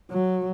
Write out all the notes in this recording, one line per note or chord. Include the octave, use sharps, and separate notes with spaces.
F#3